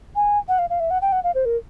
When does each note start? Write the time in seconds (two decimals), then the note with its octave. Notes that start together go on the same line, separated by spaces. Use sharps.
0.16 G#5
0.48 F#5
0.58 F5
0.70 F5
0.80 E5
0.90 F#5
1.02 G5
1.12 F#5
1.24 F5
1.35 C5
1.45 A#4